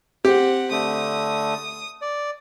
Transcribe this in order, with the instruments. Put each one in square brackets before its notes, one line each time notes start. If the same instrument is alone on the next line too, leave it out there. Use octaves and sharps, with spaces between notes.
[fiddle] C4 F#5 [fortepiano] G4
[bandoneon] D3 A3 [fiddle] D#6
[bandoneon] D5